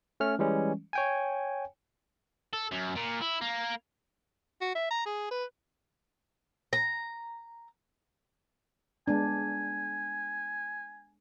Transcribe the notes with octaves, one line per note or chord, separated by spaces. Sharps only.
A3 C#4 F6
E3 G3 G#3 C#4
C#5 G5 G#5
A4
F#2
A#2
E4
A#3
F#4
E5
A#5
G#4
B4
A#5
G#3 B3 D4 G#5